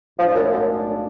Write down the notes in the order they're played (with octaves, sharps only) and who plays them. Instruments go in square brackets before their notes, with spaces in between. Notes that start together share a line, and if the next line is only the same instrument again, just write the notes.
[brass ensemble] B1 A2 G#3 D4 F4 [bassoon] F3
[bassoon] F#2
F#2